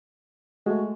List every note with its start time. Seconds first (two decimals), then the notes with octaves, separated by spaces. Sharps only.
0.66 G#3 A3 F#4